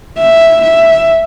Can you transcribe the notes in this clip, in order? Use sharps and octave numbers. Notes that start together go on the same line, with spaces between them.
E5
E5